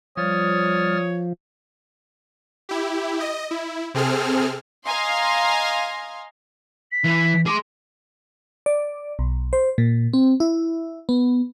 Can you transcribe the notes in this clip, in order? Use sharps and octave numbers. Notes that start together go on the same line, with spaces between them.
F3 G3 C#5 D#6 F6 A6
E4 G4
D#5
E4
C3 C4 G#4 A4 F6
D#5 F5 G#5 A#5 C6
B6
E3
G#4 C6 D6
D5
B1
C5
A#2
C4
E4
B3